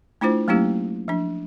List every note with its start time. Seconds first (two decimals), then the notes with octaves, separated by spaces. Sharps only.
0.21 A3 D4 E4 F4 C5
0.48 F#3 A3 A#3 C#4 E4 G4
1.08 F3 D4